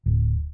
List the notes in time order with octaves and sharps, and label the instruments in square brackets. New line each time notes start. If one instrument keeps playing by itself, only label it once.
[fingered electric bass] D1